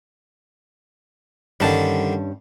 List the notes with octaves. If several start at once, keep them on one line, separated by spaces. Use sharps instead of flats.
G2 D3 D#3 G3 C#4 A5